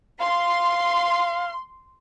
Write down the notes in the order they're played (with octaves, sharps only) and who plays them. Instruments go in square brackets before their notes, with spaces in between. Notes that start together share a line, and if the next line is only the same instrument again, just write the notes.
[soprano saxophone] F5 [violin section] C6